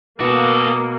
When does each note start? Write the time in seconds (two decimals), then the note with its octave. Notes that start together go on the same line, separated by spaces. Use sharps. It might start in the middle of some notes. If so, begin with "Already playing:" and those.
0.20 B2 A#3 F#4 A4 B5 D6 D#6